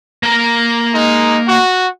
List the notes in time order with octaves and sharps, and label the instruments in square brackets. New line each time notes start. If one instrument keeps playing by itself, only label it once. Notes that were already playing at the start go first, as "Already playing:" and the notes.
[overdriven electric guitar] A#3 A#5
[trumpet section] G#3 D#4
F#4